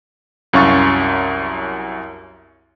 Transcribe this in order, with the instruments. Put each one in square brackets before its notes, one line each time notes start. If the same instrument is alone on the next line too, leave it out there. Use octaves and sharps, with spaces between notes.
[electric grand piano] C2 F#2 C#4 F5 C#6 A6